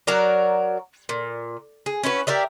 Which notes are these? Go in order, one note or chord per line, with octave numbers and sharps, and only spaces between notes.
F#3 F#4 A#4 D5
A#2
G#4
C#4 E4 F#4 B4
G4 A#4 D5 E5